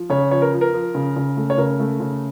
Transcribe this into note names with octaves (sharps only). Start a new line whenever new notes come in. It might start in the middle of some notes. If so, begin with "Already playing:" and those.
Already playing: F3
C#3 C#5
F3 C#5
A#4
F3
A#4
F3
C#3
C#3
A3
C#5
C#3 A#4
A3
C#3